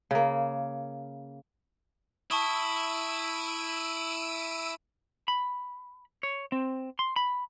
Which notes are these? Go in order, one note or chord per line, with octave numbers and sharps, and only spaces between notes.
C#3 A#3
E4 A5 C#6 D#6 E6 D7 D#7
B5
C#5
C4
C6
B5